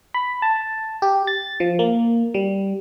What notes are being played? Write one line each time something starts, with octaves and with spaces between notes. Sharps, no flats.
B5
A5
G4
A6
F3
A#3
G3